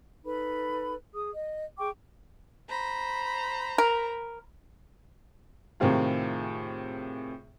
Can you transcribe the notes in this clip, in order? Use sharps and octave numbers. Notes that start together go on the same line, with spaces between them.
D#4 A4 B4 B5
G#4 D#6
D#5
G#4 G5 C#6 D6
C5 A#5 B5
A#4
A2 C3 D#3 C4 F4 G#4